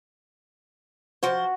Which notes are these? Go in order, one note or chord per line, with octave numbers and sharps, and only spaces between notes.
F3 F#4 C5